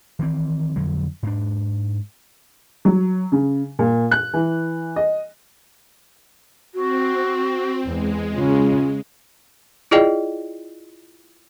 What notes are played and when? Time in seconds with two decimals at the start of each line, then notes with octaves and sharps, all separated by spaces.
0.19 D#3 E3 C4
0.76 F2 D3 F#3
1.23 G#2 D4
2.85 F#3
3.32 C#3
3.79 A#2
4.11 F#6
4.33 E3
4.96 D#5
6.74 C4 F#4
7.85 E2 G#3
8.34 C#3 C#4 F4
9.91 E4 F4 G#4 D5 D#5 G5